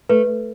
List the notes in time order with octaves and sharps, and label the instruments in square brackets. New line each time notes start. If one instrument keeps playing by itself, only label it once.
[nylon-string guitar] A3 [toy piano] B4